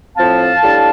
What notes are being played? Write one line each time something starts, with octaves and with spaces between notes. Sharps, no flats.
A2 F3 C4 F5 A5
A2 G3 D4